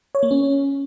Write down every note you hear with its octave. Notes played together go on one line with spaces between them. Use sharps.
C#5
A#3
C#4